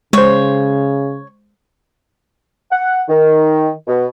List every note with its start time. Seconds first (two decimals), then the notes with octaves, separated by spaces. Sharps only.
0.13 C#3 G#3 C5 C#5
2.72 F#5
3.09 D#3
3.88 B2